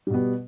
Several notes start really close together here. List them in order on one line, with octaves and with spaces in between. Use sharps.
G3 B2 B3